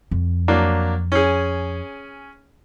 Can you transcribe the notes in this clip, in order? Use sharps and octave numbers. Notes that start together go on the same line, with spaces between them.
F2
F#3 A#3 D4
C#4 G#4